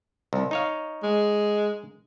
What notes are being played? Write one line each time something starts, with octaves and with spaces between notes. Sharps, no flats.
C2
D#4 C#5 F5
G#3